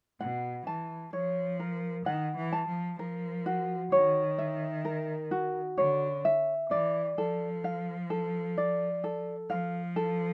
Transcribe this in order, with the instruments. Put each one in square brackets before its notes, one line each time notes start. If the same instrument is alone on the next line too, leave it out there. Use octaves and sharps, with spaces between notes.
[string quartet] B2 [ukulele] F#5
[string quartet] E3 [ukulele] A5
[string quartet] F3 [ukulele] C#5
[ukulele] A#4
[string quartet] D#3 [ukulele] F#5
[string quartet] E3
[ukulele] A5
[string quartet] F3
[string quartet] F3 [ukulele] A#4
[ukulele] F#4
[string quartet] D#3 [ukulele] C#5
[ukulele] E5
A#4
F#4
[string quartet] D3 [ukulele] C#5
[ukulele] E5
[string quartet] E3 [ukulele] D5
[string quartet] F3 [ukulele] A4
[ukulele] F5
A4
D5
A4
[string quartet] F3 [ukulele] F5
[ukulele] A4